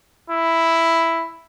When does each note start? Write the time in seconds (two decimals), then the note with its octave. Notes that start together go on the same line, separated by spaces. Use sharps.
0.30 E4